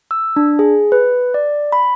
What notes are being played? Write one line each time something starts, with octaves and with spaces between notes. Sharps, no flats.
E6
D4
G#4
B4
D5
B5